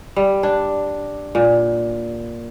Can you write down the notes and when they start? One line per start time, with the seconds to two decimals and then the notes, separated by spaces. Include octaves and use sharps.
0.16 G3
0.43 D4
1.35 A#2